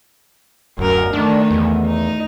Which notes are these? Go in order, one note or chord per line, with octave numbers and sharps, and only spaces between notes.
D1 F#2 A#4
D#3 A3 D4
E2
D#4